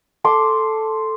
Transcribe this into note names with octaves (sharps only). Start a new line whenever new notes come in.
A4 C6 D6